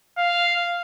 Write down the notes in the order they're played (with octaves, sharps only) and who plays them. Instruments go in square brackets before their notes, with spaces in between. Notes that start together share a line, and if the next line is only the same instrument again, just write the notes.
[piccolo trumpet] F5